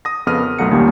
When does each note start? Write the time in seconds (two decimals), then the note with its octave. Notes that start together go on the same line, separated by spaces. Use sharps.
0.05 D#6 A#6
0.27 F2 C#3 B3 D#6 F6 D#7
0.39 A#4
0.59 B1 F#2 A3 F#5 A#5 C#7
0.71 D#2 A#2 D#3 G3 A#3 C#4